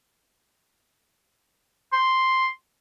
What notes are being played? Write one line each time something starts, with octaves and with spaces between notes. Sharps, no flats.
C6